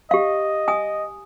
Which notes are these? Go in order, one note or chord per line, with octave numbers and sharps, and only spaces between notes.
G4 D#5 F5
G#5 D#6